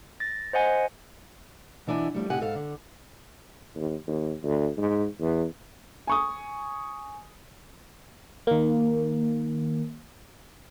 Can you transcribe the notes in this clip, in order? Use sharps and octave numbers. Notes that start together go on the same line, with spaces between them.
A6 A#6
C5 D#5 F#5 G#5
B2 E3 D4 E4 G#5
F3 G3 A3
A2 C3 D#4 G4 F#5 G#5
G#2 A4 F5
D3
D#2
D#2
D2
G#2
E2
G#5 C#6 D#6
D#3 A#3